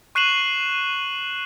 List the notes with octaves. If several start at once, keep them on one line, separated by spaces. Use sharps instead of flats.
C#6 F#6 C7 D#7 E7 F#7